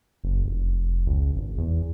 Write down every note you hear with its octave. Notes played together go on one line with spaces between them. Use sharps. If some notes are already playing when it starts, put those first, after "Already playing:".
F#1
F1
C#2
G#1
E2